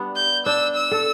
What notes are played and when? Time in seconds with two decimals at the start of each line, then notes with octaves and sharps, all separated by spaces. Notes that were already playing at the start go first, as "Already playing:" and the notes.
Already playing: G3 B3 D4
0.16 G6
0.46 D4 E6
0.76 E6
0.91 A4